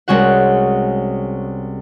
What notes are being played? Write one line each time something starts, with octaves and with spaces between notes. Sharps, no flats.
C2 G#3 C#4 F#4 F#5